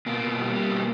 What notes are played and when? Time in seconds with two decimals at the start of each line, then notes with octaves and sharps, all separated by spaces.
0.06 B2 A#3
0.22 B2
0.39 G3
0.55 G3
0.70 B2